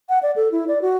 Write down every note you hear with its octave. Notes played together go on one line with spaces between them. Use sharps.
F#5
D5
A4
E4
D5
F#4